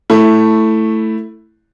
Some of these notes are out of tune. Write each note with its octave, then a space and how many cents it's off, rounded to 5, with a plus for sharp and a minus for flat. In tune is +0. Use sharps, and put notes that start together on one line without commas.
A3 +5 E4 +0